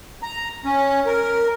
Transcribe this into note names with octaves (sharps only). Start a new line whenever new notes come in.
A#5
C#4
A#4